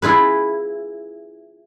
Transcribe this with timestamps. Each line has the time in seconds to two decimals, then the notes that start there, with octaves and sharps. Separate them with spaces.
0.02 E4 F4 G#4 B4